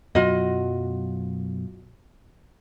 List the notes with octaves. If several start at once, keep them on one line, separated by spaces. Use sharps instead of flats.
F#2 B2 F#3 F4 F#4 D#5